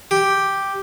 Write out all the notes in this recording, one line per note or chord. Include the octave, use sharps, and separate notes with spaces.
G4